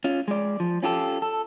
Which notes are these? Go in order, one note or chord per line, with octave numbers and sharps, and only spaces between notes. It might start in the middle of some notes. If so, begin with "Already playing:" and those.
C#4 F4
G#3 D5
F3
C#4 F4 G4 A4
A4